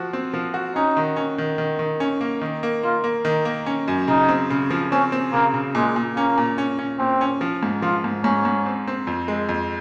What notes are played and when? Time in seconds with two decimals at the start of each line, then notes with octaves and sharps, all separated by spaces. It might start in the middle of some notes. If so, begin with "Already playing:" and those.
Already playing: F3 F#4
0.13 C4
0.34 F3
0.54 F#4
0.75 C#4 D#4
0.97 D#3
1.16 C#4
1.38 D#3
1.58 D#3
1.79 D#3
2.00 C#4
2.21 A#3
2.41 D#3
2.63 A#3
2.83 A#3 F4
3.04 A#3
3.25 D#3
3.45 A#3
3.66 C#4
3.88 F#2
4.08 C#3 D#4
4.28 C4
4.50 C#3
4.70 F3
4.92 C4 C#4
5.12 C4
5.33 C#3 A#3
5.54 C#3
5.75 A#2 G#3
5.96 A#2
6.16 A#3 C#4
6.38 A#2
6.58 C#4
6.79 C#4
6.99 A#2 C4
7.21 C#4
7.41 F3
7.63 G#2
7.82 F3 F4
8.04 G#2
8.24 G#2 C#4
8.45 G#2
8.66 C4
8.87 C4
9.07 F2
9.28 G#3
9.49 F2